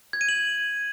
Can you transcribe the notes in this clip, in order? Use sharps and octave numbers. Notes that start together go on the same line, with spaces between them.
G#6
D#7
F#7